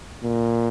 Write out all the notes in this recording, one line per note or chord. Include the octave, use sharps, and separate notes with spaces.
A#2